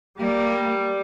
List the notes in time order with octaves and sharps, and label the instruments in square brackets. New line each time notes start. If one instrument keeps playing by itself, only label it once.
[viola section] G3 [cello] A#3